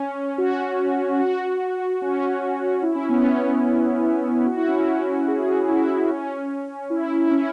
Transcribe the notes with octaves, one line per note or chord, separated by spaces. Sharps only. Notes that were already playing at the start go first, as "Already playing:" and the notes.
Already playing: C#4
F#4
F#4
C#4
E4
C#4
B3
C#4
F#4
E4
C#4
E4
G#4
E4
C#4
E4
E4
C#4